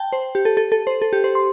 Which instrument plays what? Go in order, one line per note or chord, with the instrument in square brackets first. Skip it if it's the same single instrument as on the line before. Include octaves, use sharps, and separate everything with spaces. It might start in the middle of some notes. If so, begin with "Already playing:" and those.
Already playing: [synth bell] G5 A5
C5
G4
A4
A4
A4
C5
A4
G4
C5
C6